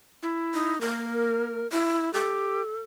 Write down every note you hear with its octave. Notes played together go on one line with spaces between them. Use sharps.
E4
D#4
A#3 A#4
E4
G4 A4